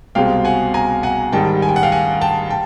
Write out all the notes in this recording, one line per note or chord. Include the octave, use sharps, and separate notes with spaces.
C2 B2 G#3 C4 F5 G5
F#5 G#5
G#5 A#5
F#5 G#5
G#2 D#3 G3 G5 A5
G#5
G5
F#5
F5 G5
F#5 G#5
G5 A5
G5 A5